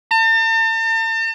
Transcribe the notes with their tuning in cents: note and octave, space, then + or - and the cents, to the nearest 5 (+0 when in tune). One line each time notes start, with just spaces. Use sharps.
A5 +45